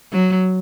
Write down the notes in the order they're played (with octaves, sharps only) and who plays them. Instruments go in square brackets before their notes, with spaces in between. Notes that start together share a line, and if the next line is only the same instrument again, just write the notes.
[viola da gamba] F#3